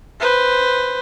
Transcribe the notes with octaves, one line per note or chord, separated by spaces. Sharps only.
B4 C5